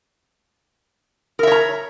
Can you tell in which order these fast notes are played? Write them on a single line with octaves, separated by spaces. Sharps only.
A#4 E5 C#5 A#5